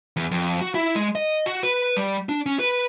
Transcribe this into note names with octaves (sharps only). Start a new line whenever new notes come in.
E2
F2
F#4
E4
G#3
D#5
F#4
B4
G3
D4
C#4
B4